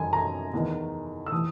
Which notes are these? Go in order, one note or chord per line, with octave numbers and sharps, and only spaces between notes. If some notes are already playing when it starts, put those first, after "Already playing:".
Already playing: F#2 D#3 G#5
A#5
E2 D#3
E6
E3 D#6